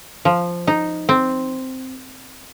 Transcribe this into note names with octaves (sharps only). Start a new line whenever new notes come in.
F3
D#4
C4